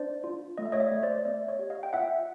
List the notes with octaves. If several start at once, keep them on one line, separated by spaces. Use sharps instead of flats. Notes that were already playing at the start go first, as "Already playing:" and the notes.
Already playing: D4 C5 D5
F4
A3 D#5
E5
C#5 D#5
D5 E5
A3
C5 D5
B3 D5 E5
C#5 D#5
G4
D#5 F5
G5
F4 E5 F#5